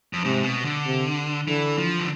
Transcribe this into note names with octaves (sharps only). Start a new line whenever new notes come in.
F2
G#2 C3
B2
D3
C3
D3 E3
F3
D3